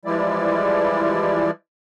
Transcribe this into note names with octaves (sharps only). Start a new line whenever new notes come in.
E3 F3 G3 G#3 E4 D5